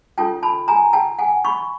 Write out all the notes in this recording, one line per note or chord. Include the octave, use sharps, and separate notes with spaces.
C#4 F4 A4 C#5 G5 A5
A5 B5
G#5 A#5
G5 A5
F#5 G#5
B5 C#6